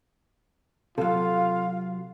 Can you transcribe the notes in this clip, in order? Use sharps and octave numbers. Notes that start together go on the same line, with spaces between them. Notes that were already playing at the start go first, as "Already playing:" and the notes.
C3 F#3 F4 A4 F5